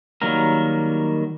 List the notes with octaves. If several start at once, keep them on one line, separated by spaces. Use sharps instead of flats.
D#3 F#3 G3 A#3 A#4